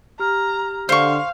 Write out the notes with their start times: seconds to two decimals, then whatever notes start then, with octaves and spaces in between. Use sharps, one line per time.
0.19 G4 A#5 F6
0.89 D3 C5 F5 C#6